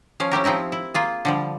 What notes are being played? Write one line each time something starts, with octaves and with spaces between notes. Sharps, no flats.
F3 C#4 F5
C#4 E4 G4 A#4
F3 C4 D#4 E4 A#4
E4
A#3 F4 G#4
D3 F3 G3